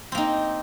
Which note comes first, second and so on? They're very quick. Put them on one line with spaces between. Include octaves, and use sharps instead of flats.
C4 A#3 D#4